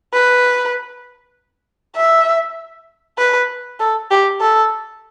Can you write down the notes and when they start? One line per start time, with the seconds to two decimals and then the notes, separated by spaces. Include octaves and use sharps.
0.13 B4
1.96 E5
3.18 B4
3.80 A4
4.11 G4
4.41 A4